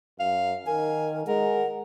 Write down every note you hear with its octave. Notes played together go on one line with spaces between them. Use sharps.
F#2 F5
D#3 A#4 G#5
G#3 A#4 F#5